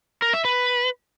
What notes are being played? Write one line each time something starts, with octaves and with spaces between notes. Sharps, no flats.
A#4
E5
B4